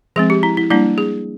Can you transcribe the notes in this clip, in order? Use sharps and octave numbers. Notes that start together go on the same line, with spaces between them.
F3 G#3 C4 G#4
G4
E4
E4
G3 A#3 D4 E4
G#4